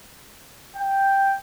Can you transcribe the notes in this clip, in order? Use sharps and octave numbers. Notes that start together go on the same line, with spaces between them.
G5